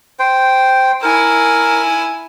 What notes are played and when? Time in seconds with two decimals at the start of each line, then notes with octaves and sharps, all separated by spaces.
0.19 C5 G5
1.03 E4 A#4 G#5